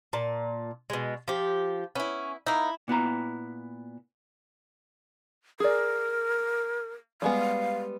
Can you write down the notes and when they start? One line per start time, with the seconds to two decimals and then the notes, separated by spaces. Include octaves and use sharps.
0.13 A#2 A5
0.90 B2 G#3
1.28 F3 G4
1.95 B3 C#4 E4
2.46 A#3 D#4 E4
2.88 A#2 B3 E4 A#5
5.60 G#4 A#4 D5
7.22 G3 G#3 B3 F5